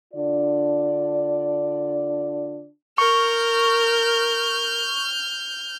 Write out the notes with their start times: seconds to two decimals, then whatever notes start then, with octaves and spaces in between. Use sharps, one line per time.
0.14 D3 D4 F4 D5
2.98 A#4 C#6 F6 G6